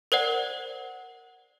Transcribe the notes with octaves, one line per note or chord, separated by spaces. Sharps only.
A#4 C5 D5 F#5